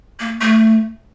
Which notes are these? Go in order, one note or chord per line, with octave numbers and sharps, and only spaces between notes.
A#3
A3